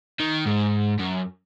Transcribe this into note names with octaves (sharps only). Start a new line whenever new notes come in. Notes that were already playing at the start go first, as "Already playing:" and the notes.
D#3
G#2
F#2